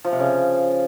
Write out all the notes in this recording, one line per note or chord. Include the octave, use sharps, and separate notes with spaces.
F3
C3
C#3